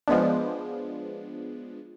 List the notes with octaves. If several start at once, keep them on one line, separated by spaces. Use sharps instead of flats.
F3 G#3 B3 D4